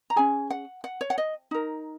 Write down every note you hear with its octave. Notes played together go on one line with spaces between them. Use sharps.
A#5
C#4 G#4 G#5
F#5
F#5
C#5
F#5
D#5
D#4 A#4